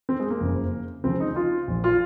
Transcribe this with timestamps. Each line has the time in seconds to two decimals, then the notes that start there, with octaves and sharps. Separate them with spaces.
0.09 C4
0.20 G#3
0.30 A#3
0.40 F#1 F2 C#3
1.04 C#2 C#3 F3 C4
1.20 D#4
1.36 F4
1.68 A#1 A#2 F3
1.84 F4